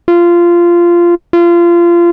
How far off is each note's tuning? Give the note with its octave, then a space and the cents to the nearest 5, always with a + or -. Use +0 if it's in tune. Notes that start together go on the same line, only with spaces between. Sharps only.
F4 -15
F4 -25